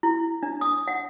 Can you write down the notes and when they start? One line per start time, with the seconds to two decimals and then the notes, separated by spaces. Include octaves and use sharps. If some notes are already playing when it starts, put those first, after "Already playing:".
0.03 E4
0.43 D4
0.61 D#6
0.88 F#5